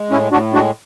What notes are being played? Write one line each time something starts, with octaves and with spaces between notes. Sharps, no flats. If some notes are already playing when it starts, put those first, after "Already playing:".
Already playing: G#3
A2 C#4 E4
A2 D4 F#4
G#3 D4 F#4